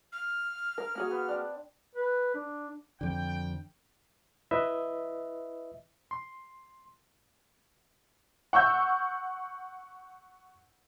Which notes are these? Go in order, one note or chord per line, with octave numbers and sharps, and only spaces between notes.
F6
A#4
A#3 F#4 G#4
B3
C4 D4
B4
D4
F2 D3 G5
E4 B4 D#5 E5
C6
F#5 C#6 E6 G6